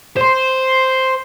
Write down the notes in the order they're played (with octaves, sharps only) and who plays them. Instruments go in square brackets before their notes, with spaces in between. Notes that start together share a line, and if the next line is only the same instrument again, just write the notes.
[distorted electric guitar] C5 C6